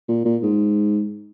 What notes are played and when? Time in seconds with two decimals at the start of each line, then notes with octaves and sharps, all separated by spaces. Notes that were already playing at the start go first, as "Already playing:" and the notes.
0.09 A#2
0.25 A#2
0.43 G#2